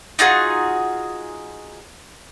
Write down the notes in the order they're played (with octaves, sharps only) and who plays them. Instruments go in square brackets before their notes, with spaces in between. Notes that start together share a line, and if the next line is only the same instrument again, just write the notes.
[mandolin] D#4 F4 F#4 G#4